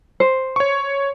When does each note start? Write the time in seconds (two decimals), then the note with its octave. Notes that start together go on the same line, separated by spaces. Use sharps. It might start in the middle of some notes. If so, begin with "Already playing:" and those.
0.20 C5
0.56 C#5 C#6